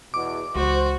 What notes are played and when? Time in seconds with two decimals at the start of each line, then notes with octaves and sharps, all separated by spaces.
0.14 E2 B2 D6
0.55 C#2 E3 F#4 C5